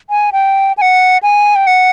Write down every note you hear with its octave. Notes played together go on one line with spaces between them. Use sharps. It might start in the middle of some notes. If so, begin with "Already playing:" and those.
G#5
G5
G#5
F#5
G#5
G5
F#5